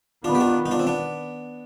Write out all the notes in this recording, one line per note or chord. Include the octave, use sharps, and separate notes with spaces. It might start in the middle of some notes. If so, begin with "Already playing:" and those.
D#3 B3 D4 F4
G4
D4 F4
D#4
D4 F4
C4
B3 D4